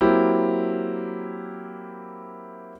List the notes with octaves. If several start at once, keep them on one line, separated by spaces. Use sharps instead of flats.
F#3 A#3 C4 E4 G4